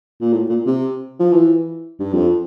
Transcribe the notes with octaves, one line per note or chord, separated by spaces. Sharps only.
A#2
A2
A#2
C3
F3
E3
G2
F2